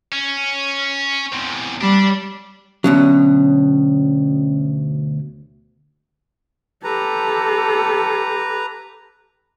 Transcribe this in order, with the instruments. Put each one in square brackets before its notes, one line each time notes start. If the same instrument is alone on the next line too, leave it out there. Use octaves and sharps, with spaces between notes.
[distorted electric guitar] C#4
E2 C3
[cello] G3 [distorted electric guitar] D4
[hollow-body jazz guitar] D2 B2 F#3 [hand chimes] C#4
[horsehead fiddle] G4 A4 [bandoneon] B4 A#5